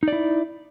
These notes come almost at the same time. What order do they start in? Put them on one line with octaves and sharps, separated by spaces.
D#4 D5 E4